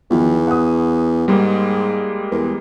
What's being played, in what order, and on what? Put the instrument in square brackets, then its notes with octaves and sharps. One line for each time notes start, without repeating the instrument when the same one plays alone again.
[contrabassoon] E2 [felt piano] D#3 F3 B3
[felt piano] F#5 D#6
[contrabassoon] G#2 [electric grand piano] G3 G#3 A#3
[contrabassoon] E2 [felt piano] A#4